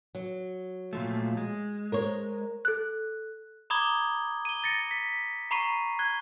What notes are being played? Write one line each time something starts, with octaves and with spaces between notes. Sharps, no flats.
F#3
A#2 F3 A3
G#3
A#4 C5 C#5
A4 F#6
A#5 B5 D6 D#6 G#6 G7
D#7 G7
A6 A#6 C#7
B6
A#5 B5 C#6 C7 D#7
F#6 G#6 G7